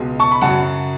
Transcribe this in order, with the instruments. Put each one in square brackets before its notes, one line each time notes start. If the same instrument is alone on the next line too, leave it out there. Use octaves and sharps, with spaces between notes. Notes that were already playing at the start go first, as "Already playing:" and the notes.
Already playing: [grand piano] C#2 B2 G#3
A5 C#6
B5
F#2 C#3 F#3 F#5 A5